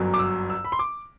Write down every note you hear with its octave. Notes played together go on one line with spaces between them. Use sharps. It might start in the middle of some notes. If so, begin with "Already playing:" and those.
Already playing: G1 F#2 F#3
D6
E6
E6
B5
C6
D6